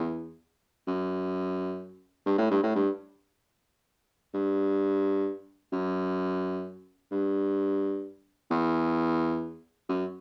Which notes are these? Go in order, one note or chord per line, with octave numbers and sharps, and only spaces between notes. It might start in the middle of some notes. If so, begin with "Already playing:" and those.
Already playing: E2
F#2
G2
A2
G2
A2
G2
G2
F#2
G2
E2
F#2